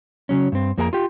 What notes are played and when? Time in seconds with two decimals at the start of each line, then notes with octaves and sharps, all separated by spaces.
0.29 C#3 F#3 C#4
0.52 G2 C4
0.78 F2 A#3 G#4 A#4 G#5 A#5
0.93 F4 G4